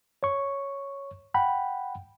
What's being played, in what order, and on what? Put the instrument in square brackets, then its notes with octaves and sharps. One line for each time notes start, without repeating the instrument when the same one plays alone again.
[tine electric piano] C#5 C#6
F#5 G5 B5